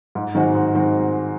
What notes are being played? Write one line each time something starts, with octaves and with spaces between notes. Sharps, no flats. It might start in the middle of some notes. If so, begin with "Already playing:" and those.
G#2
D#3 G#3 C4 F#4
G#2
D#3 G#3 C4 F#4